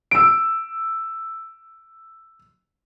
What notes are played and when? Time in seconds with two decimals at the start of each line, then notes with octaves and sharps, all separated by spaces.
0.11 E6 D7